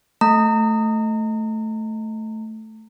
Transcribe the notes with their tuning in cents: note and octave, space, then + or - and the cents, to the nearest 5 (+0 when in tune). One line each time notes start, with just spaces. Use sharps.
A3 +0 A#5 -35